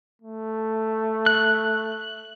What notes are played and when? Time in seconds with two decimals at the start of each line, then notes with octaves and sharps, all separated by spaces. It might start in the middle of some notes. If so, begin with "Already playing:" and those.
0.22 A3
1.26 F#6